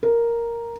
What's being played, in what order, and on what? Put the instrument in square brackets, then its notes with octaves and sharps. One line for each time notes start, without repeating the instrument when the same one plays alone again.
[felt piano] A#4